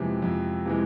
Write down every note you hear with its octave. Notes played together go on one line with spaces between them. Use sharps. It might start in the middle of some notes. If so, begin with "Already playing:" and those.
Already playing: F2 C3 E3 G#3
F2
C3 E3 G#3